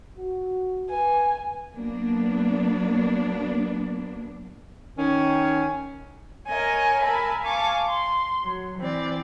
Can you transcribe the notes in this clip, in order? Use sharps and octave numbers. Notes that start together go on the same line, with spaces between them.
F#4
B4 G#5
F#3 A#3 B3 D4
D#3 C#4
A#4 C#5 D#5 G#5
A#4 E5 G#5 A5 B5
F5 G#5 A5 C#6 D6
C6
F#3
E3 C4 D5